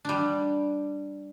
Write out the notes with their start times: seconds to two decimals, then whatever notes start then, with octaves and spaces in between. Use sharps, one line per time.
0.05 G3 D4